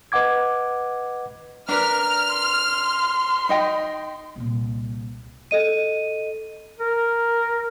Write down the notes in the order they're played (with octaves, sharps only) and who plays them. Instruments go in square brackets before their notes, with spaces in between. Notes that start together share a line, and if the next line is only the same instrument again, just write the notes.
[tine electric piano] B4 D#5 F#5 D6 G#6
[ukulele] D4 B4 [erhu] A#4 [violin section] F6
[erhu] C6
[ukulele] D#4 D#5 G5
[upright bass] C2 A#2
[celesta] A4 D#5 D#7
[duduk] A#4